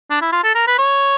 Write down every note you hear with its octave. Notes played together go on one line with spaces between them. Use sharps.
D4
E4
F4
A4
A#4
B4
C#5